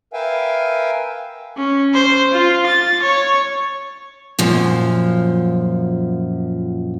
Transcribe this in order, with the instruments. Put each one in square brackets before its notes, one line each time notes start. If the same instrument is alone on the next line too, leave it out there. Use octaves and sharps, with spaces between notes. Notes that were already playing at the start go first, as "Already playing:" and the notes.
[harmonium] A#4 B4 E5 F5 G5 G#5
[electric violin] C#4
C5
F4
A6
C#5
[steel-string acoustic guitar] F#2 A#2 F3